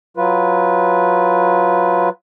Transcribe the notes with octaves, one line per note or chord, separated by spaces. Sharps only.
F#3 F4 B4